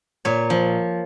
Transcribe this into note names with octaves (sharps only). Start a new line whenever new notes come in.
A#2 C#5
F3